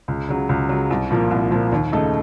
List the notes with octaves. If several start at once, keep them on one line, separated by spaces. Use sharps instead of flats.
C#2
C#3 F#3
C#2
C#3 F#3
C2
A#2 F3 A#3
C2
A#2 F3 A#3
D#2
C#3 A3 D#4 A4